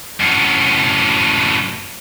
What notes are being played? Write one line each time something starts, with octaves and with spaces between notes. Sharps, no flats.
F#2 A2